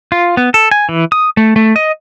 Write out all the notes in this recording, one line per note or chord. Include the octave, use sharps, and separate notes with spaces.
F4
B3
A4
G#5
E3
D#6
A3
A3
D#5